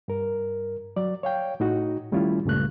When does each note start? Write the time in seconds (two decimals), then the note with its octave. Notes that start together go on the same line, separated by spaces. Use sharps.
0.08 G2 A#4
0.96 F#3 D5
1.23 C#5 F5 G5
1.60 A2 D#4 F#4
2.12 D#3 G3 A3 C#4 E4 F4
2.45 C#2 G2 A#2 C#3 A3 F#6